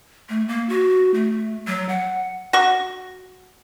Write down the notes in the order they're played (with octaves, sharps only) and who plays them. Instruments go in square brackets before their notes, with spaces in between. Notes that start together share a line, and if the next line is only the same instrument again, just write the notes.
[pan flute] A3
A#3
F#4
A3
F#3
F#5
[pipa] F#4 C#6